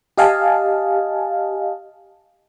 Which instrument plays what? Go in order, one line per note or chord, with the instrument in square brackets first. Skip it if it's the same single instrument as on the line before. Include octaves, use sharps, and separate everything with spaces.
[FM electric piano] G4 D#5 F5 G#5 A5